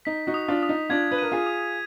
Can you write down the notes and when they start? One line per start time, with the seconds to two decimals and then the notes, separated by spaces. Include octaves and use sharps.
0.05 D#4 B6
0.27 D#4 F#4
0.34 D#6
0.48 D4 F4
0.63 D#6
0.69 D#4
0.90 D4 F4 G#6
1.11 B4
1.18 A#4 D#7
1.32 F4 G#4
1.47 D#6